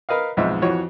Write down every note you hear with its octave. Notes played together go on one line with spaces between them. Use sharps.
A#4 B4 D#5 F5
B1 F2 G#2 G#3 C5 E5
F2 E3 F#4 C#5